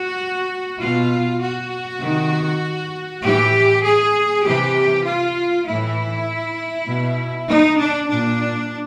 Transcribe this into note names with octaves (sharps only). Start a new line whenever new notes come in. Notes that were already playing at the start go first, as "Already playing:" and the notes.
Already playing: F#4
B2 F4
F#4
C3 D#3
A2 E3 G4
G#4
C3 E3 G4
F4
A2 E3 E4
B2
D#4
D4
A#2 D4